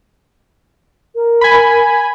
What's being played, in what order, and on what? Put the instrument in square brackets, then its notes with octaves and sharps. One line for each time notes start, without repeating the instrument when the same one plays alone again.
[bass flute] A#4
[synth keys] G#5 B5